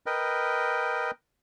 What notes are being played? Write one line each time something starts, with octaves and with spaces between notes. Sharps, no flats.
A#4 B4 D#5 G5